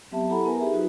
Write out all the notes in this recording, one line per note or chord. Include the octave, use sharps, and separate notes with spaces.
F#3 B3 C4 G4 E5 A5
E4 G4 A4 F#5 A#5 B5
B3 A#4 B4 G#5
D#4 G4 G#4 E5
F#3 D#4 F4 F#4 B4